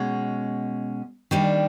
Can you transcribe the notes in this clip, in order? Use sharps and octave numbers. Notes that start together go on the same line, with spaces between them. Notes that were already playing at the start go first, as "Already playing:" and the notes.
Already playing: B2 G#3 C#4
D#3 G3 A#3 D4